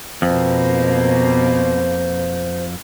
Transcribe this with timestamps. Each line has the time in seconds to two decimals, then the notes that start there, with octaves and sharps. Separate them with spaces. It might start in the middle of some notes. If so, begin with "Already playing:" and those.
0.22 F2 B2 A#3 C5